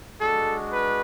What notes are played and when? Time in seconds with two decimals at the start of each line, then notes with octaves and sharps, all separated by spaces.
0.20 G#3 D4 F#4 A4
0.72 B4